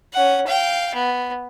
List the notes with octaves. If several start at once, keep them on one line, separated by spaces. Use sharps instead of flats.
C#4 F#5
F5 G5
B3